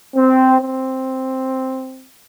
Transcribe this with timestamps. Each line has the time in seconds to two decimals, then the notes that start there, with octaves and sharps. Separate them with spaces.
0.14 C4
0.60 C4